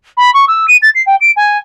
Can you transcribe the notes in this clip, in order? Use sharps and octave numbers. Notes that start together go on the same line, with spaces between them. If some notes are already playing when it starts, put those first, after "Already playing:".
B5
C#6
E6
D#7
A6
C7
G5
D7
G#5